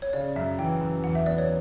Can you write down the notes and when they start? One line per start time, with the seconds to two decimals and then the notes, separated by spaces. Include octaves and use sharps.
0.02 C#5
0.13 C#3 D5
0.36 F#2 E5
0.59 E3 G5
0.81 F#2
1.04 E2 F#5
1.15 E5
1.26 B3 D5
1.38 C#5